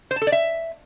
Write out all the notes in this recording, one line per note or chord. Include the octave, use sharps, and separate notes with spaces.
C5
A5
A4
D5
E5